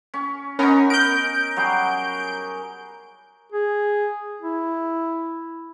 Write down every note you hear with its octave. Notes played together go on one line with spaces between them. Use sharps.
C#4
B3 C#4 D#4 A#4
A#4 G6 D7
F#3 G3 G#4
G#4
E4